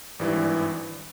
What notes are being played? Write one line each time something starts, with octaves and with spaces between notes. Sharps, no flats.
G#1 G2 E3